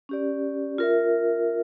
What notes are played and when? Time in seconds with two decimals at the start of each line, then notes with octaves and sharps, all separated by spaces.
0.09 C#4 G4 D5
0.78 F4 A#4 E5